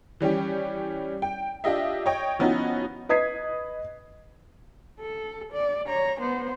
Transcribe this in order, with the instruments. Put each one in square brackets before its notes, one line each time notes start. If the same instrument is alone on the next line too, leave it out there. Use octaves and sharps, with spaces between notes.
[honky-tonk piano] E3 G3 C#4 G4
G5
D4 F4 G4 D#5 E5
C#5 D#5 G5
F3 B3 C#4 D#4 E4 F#4
[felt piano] B4 D#5 D#6 G#6 B6 C7
[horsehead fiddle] A4
D5
C#5 A#5
B3 C5